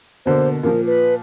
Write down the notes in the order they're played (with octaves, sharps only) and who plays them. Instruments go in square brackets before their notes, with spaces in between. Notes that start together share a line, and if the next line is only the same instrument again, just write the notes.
[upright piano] B2 D3 A#3 [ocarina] C5
[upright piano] A#2 F3 [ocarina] A#4
[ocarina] B4